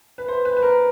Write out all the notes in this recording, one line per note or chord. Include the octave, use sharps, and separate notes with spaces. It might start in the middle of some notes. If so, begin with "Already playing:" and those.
B4
C5
B4
B4
A#4